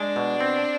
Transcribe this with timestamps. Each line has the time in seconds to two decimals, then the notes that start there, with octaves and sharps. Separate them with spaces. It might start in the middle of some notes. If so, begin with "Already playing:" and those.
Already playing: G#3 D4
0.16 B2
0.41 C4